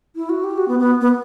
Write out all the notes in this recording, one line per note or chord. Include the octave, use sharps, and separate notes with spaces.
E4
F#4
G4
F#4
B3
B3
B3